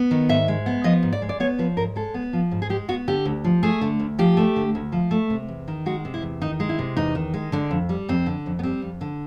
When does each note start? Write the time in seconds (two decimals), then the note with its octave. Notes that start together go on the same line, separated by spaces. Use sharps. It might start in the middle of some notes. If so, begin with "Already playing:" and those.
Already playing: B3
0.11 D#3
0.29 G#2 E5
0.48 G#3
0.66 B3
0.84 F3 D#5
1.03 G#2
1.13 D5
1.22 G#3
1.29 D5
1.40 B3 C#5
1.59 F3 B4
1.77 G#2 A#4
1.96 G#3 A4
2.14 B3
2.33 F3
2.51 G#2
2.62 G#4
2.70 G#3 G4
2.88 B3 F#4
3.08 D3 G4
3.25 D2
3.44 F3
3.63 A3 G#4
3.81 D3
4.00 D2
4.19 F3 G4
4.37 A3
4.56 D3
4.75 D2
4.92 F3
5.11 A3
5.30 C3
5.48 E2
5.68 D#3
5.86 G#3 F#4
6.05 C3
6.14 E4
6.22 E2
6.41 D#3 D#4
6.60 G#3
6.69 E4
6.79 C3
6.97 E2 D#4
7.15 D#3
7.34 G#3
7.52 D3 D4
7.71 F2
7.89 G3
8.09 F2 C4
8.26 D3
8.46 F2
8.59 B3
8.63 G3 C4
8.82 F2
9.01 D3